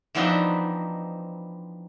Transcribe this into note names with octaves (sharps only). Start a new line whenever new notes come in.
E3 F3 B3 C4 D4 D#4